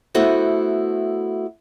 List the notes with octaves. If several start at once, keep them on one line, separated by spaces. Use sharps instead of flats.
A3 B3 E4 F#4 A4 C5